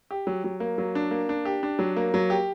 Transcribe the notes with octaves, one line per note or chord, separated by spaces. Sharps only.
G4
F#3
F#3
A#3
F#3
D4
A#3
D4
G4
D4
F#3
A#3
F#3
G4